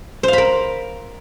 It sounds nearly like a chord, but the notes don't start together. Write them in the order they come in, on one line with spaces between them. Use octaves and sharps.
C5 F5 B5 A#4